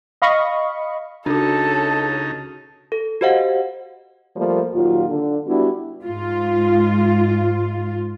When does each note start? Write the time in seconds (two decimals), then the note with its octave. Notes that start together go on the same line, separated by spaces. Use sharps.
0.22 D#5 F5 B5 C#6
1.26 C#2 C#3 D4 D#4 F#4 A4 A5
2.92 A4
3.21 F#4 G4 C5 D#5 F5 F#5
4.36 F3 G3 A3 A#3
4.74 D#2 A#2 F#3 F4
5.09 D3
5.46 G3 B3 D4 E4 F#4
6.03 G#2 F4